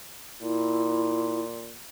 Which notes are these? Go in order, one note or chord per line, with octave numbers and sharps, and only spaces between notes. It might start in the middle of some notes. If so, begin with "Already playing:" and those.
A#2 E4